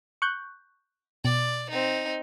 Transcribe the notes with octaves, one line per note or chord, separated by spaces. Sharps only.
C#6 F#6 G6
B2 D5
C4 D#4